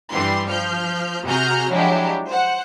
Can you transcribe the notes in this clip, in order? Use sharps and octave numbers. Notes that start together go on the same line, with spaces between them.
G2 E3 G3 C6
F3 F6 G6
C3 F#4 G#4 A#5 F6 G6
F3 F#3 G#3 D4 E4 G4
C5 F#5